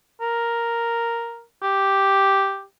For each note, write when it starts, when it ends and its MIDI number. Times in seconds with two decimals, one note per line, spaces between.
0.21 1.43 70
1.63 2.64 67